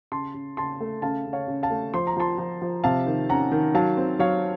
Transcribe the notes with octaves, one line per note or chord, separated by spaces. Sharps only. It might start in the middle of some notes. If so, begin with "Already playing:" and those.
C#3 A5 C6
C#3
C#3 A5 C6
A3
C#3 F5 A5
C#3
C#5 F5
C#3
F5 A5
A3
F3 C6
A#5
F3 A5 C6
F3
F3
C3 F5 A5
D#3
C#4 F#5 A#5
D#3
F#3 F5 A5
C4
F#3 C#5 F5